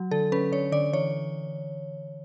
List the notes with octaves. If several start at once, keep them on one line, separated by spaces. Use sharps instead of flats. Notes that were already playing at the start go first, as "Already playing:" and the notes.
Already playing: F#3
D3 A4
C#4 B4
D3 C#5
D3 D5
E3 C#5